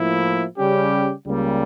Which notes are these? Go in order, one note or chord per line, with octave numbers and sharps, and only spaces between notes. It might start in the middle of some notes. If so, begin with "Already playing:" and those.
Already playing: A2 F3 A#3 E4
C#3 G3 C#4 G4
C#2 C#3 G3 A#3